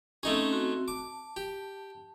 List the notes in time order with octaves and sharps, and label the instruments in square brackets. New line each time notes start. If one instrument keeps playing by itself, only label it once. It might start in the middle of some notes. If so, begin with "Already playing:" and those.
[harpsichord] A3 D#4 G#4 [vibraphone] C4 C#4
[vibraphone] C4 F#4
[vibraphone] A5 [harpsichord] D6
[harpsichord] G4